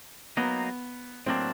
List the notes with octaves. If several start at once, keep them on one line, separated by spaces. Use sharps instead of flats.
F#3 A#3 B3 D#4
A2 F#3 A#3 C4 D4